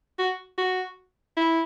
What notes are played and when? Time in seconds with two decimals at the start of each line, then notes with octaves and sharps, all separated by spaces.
0.18 F#4
0.58 F#4
1.37 E4